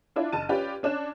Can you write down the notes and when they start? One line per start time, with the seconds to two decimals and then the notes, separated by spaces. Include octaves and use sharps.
0.16 D4 E4 F4
0.32 F#1 A5 D#7
0.49 C#4 F4 G4 B4 D5
0.83 C#4 D4 F#6 E7